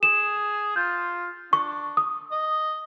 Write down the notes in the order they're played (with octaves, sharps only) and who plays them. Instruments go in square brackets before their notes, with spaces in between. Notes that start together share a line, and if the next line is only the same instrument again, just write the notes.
[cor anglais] G#4 [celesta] E7
[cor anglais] F4 [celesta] G6
[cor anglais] D4 [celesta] C#6
[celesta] D#6
[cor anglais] D#5